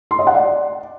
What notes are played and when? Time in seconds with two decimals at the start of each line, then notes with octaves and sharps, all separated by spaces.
0.11 C6
0.19 D#5
0.27 F#5
0.35 D5